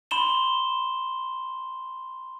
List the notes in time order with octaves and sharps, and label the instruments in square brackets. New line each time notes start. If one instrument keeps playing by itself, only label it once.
[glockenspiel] B5 C6 E7 G7